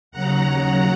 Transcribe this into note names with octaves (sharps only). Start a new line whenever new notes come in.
D#2 C#3 F#3 F#5 A#5